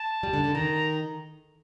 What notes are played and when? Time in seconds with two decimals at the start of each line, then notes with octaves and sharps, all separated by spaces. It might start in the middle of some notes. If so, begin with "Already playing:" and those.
Already playing: A5
0.23 G3
0.33 D3
0.44 D3
0.55 D#3 A#5